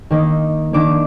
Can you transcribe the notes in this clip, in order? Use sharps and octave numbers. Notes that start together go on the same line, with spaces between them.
D#3 A#3 D#4
D#3 A#3 D4 D6